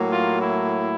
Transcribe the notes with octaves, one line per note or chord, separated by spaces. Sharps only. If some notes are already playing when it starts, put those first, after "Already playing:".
Already playing: A2 F#3 A#3
F4
E4